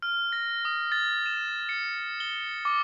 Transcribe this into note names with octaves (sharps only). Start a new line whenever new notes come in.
F6
A#6
D#6
A6
E7
C#7
G7
D6